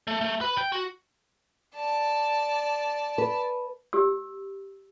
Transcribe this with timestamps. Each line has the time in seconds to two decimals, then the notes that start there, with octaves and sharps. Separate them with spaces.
0.07 A3
0.21 A3
0.41 B4
0.57 G5
0.72 F#4
1.76 D5 A5
3.18 B4
3.93 G4 E6